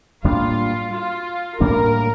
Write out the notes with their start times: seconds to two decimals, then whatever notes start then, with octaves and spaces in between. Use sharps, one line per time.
0.24 A2 G3 A#3 D4 F4
0.93 F4
1.60 A2 G3 A#3 D4 A#4